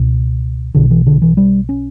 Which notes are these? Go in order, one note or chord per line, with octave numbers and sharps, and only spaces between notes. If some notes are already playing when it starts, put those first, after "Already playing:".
Already playing: C#2 B2
B1 B2 D3
E3
D3
E3
G3
C#4